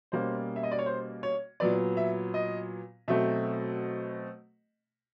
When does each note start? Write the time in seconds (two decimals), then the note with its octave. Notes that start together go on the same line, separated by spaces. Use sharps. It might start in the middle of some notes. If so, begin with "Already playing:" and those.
0.12 B2 G3 A#3 C#4 C5
0.56 E5
0.63 D#5
0.72 D5
0.79 C#5
0.86 C5
1.23 C#5
1.60 A#2 F#3 B3 D5
1.97 E5
2.34 D#5
3.08 B2 F#3 A3 C4 E5